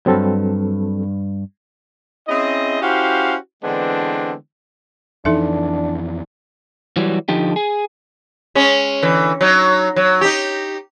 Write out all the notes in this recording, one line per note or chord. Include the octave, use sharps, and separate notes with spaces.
D2 G2 F#3 C4 A4
C4 C#4 E4 G#4 D#5
C#4 E4 F#4 G4 C5 F5
D3 E3 G#3 B3 C4 D4
F2 E3 D4 D#4 A4 E5
E3 F#3 G3
D3 F3 D#4 G4
G#4
G#3 C#4
D3 E3
F#3 D#4
F#3
D#4 G4